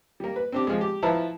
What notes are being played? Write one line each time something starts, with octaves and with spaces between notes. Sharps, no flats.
G3 A#3
B4
C4 D4 G4
F3 G#3
G4
F3 E4 B4 A5 A#5